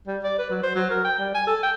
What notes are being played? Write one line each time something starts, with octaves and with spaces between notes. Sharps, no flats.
G3
D5
B4
F#3
C5
F#3
A#4
G5
G3
G#5
A4
G5